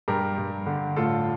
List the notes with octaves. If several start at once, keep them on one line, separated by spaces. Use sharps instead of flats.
G2 G4 A#4
G2
D3
A2 F4 A4